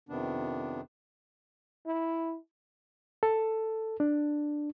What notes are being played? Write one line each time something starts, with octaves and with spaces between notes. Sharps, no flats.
F2 C3 D#3 B3 D4
E4
A4
D4